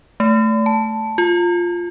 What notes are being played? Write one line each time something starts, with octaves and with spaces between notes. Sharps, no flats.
A3
A5
F4